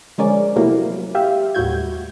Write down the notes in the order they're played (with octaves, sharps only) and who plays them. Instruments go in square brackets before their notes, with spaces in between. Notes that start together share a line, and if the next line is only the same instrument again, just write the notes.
[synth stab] D3 F3 G#3 C#4 A#4 D5
C3 F#3 A3 A#3 E4
F4 G4 E5
D#2 A2 G3 F#4 G6 G#6